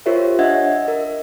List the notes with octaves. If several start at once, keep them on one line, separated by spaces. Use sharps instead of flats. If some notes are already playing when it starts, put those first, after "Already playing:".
F4 G4 A#4 C5 C#5 E5
D4 D#5 E5 F#5 G#6
A#4 D#5